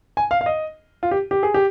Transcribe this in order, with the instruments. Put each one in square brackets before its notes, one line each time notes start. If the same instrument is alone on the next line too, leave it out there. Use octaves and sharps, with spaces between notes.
[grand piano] G#5
F5
F5
D#5
F4
G4
G4
G#4
G4